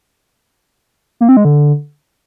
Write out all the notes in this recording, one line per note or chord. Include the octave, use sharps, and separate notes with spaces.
A#3
C4
G#3
D3